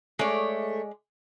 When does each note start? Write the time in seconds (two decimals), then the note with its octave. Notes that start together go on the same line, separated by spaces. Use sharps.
0.19 G#3 A3 C#5 D5